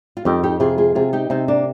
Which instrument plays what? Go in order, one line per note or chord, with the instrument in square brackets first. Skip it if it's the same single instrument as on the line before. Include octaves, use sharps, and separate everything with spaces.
[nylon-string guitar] F4
[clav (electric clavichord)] F2 [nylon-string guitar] D#4 G4
[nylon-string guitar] D#4 G4
[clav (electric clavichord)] C3 [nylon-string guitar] F4 G#4
[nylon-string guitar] F4 G#4
[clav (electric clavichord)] C3 [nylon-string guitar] F4 G#4
[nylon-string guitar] D#4 G4
[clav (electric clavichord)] C3 [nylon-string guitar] C4 D#4
[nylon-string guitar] A#3 D4